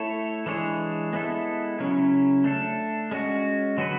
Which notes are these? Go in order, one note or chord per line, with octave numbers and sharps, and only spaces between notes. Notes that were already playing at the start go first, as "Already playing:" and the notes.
Already playing: A3 E4 A4 C#5
E3 G#3 D4 G#4 C#5
G#3 B3 E4 A4
C#3 F#3 C#4 E4
A3 D4 A4
G#3 C#4 F#4
D3 F#3 B3 F#4 B4